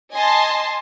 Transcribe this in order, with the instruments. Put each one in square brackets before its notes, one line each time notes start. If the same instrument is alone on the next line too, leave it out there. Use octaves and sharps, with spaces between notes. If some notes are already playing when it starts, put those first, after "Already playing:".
[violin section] D#5 G#5 A5 C6